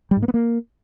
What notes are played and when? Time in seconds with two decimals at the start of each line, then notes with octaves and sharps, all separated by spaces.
0.11 G3
0.17 G#2
0.22 A#3
0.28 B3
0.34 A#3